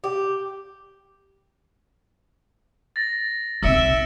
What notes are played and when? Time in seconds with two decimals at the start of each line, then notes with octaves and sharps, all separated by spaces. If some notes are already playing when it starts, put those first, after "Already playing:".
0.04 G4
2.96 A6 A#6
3.63 B1 C4 E5 E6 C#7 D7